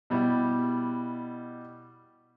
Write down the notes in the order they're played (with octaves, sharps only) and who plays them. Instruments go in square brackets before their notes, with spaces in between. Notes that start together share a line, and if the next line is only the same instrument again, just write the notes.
[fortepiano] B2 G3 E4